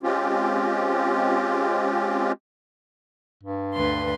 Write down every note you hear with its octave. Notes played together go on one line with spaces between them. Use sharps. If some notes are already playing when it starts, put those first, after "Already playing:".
G#3 C4 C#4 F4 G4
G2
D2 B4 C6